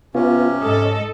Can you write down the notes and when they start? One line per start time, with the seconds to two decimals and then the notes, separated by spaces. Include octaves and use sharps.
0.15 C3 B3 C#4 F4
0.61 G#2 A4 D#5